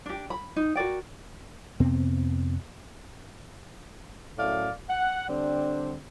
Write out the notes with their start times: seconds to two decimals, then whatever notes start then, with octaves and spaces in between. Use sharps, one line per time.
0.06 D4 G4
0.30 B5
0.56 D#4
0.76 F#4 A#4 D5 G5
1.80 F2 C3 B3 C4
4.38 F#2 A2 D5 F5
4.90 F#5
5.28 D3 G3 C4 D4